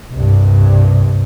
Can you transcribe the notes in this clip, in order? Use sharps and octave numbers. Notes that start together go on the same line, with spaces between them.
C2 G2